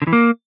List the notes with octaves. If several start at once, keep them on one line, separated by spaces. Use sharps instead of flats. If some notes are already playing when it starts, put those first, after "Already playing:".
D3
E3
A#3